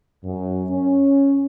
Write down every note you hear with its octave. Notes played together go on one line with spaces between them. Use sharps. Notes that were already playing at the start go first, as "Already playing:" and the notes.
F#2
C#4